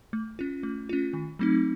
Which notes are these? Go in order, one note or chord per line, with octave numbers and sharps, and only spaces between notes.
A3
C#4 F4
A3
C#4 F4
D#3
F#3 A3 C4 D#4